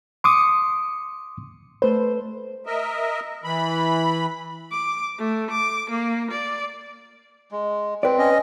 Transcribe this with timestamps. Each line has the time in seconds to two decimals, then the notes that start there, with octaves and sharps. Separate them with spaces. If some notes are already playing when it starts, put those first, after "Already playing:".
0.24 C6 D6 D#6 C#7
1.82 A3 B4 C5
2.66 A#4 D#5 E5
3.44 E3 B5
4.71 D6
5.19 A3
5.51 D6
5.90 A#3
6.31 D5
7.51 G#3
8.03 C4 B4 D5
8.18 C#4 D#5